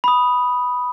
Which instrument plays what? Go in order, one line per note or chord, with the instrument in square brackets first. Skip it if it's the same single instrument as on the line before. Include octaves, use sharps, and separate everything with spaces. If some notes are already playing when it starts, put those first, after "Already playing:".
[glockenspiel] B5 D#6